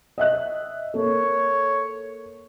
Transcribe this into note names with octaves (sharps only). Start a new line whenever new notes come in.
D#5 E5 F#6
A#3 A4 C#5